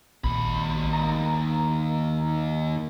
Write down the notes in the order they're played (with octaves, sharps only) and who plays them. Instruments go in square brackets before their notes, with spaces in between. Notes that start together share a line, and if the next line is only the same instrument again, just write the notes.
[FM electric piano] A#1 [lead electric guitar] D#2 B5
[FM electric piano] A#5